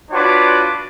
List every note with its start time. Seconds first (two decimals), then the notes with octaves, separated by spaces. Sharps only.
0.11 D4 F4 F#4 B4 C#5 D6